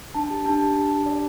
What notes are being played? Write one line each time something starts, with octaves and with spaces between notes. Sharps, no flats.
D4 A5
G4
D4 A5
G4
D4
G4
D4 D5